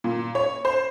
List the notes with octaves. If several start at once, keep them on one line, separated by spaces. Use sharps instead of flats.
A#2
C#5
C5